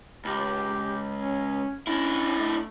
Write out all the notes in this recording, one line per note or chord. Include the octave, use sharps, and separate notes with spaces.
C#2 G4
C#4
C#4 D4 E4
A3